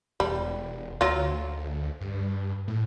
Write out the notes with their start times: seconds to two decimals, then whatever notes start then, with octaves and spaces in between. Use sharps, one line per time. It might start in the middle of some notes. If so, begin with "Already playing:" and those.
0.20 E1 G3
1.01 D2 F#3 F4
2.01 G2
2.68 A2